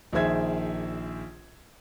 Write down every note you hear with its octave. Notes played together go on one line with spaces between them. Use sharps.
A#1 D#3 G#4 C5 E5 G#6